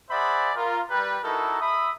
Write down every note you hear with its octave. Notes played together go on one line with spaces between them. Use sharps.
G#4 C5 D5 E5 F#5 B5
F4 A#4
G3 B4
D#4 E4 F#4 A4 A#4
E5 B5 D#6